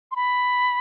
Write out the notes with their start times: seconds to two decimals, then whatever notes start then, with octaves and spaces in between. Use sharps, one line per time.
0.12 C6
0.16 B5